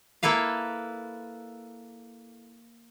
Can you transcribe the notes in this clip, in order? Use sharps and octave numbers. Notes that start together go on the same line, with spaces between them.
A#3 E4 A4 B4 F5